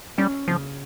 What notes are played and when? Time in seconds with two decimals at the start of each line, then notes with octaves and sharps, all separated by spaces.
0.18 G3 C#4
0.48 C#3 F3